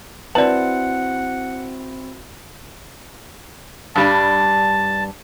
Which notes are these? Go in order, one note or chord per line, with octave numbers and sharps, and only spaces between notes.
C4 E4 F#4 B4 D5 F#5 A5
G2 G3 D4 A5